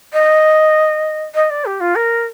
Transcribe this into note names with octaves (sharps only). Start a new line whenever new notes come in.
D#5
D#5
D5
G4
F4
A#4